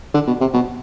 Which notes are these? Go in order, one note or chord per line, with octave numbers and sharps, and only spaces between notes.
D3
B2
C3
B2